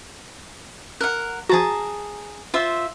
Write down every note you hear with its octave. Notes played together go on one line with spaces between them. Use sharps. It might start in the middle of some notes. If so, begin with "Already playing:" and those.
A#4 F#5 F#6
F3 F#4 G#4 A5 A#5
F4 C5 E5